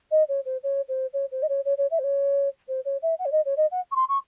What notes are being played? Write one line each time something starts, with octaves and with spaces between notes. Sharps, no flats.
D#5
C#5
C5
C#5
C5
C#5
C5
D#5
C#5
C#5
C#5
E5
C5
C#5
C5
C#5
E5
F#5
C#5
D#5
C#5
D#5
F#5
C#6
C6
C#6